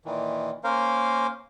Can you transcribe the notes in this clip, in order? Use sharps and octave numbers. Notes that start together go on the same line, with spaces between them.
A#2 D#3 E3
A#3 C#4 A#4 C5 F5